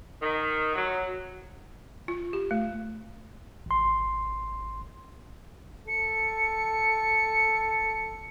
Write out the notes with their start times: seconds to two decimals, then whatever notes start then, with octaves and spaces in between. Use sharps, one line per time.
0.22 D#3
0.76 F#3
2.08 F4
2.33 G4
2.51 A3
3.66 G#1 C6
5.88 A4 C#7